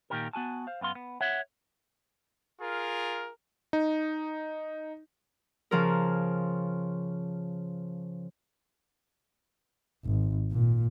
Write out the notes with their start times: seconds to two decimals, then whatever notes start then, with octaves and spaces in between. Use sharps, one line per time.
0.10 A#2 D#3 D#4 G4 A#4
0.33 B3 F#4 G#5 A5
0.67 C5 F5
0.81 F#2 B3 F5 C6
0.95 B3
1.21 C#5 E5 F#5
2.60 F4 G#4 A#4
3.73 D#4
5.71 C#3 F3 A#4
10.05 G#1
10.52 A#2